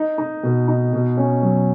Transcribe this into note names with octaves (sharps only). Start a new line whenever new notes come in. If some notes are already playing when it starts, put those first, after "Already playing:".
Already playing: D#4
D#4
B2
D#4
B2
C#4
F#3